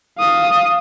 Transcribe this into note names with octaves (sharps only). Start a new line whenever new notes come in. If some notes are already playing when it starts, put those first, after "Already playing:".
F5 D#6